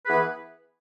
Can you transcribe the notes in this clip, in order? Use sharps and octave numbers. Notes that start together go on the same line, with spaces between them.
E3 B3 G#4 B4